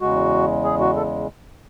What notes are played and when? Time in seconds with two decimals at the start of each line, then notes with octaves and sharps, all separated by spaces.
0.01 E2 C#3 G#3 F#4
0.64 G#4
0.80 F#4
0.96 A4